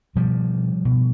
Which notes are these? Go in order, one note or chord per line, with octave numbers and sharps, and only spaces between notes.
B2 F3 G3
B2